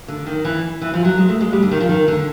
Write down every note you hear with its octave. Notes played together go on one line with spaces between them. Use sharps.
D3
D#3
E3
E3
F3
F#3
G#3
A3
G#3
G3
D3
D#3
F3
D#3
D3